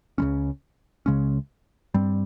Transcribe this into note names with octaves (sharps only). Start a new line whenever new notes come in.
C#2 C#3 G#3 C#4
C#2 C#3 G#3 C#4
G2 G3 C4